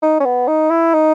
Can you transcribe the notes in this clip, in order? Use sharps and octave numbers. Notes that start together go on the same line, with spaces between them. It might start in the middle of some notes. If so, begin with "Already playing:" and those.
D#4
C#4
B3
D#4
E4
D#4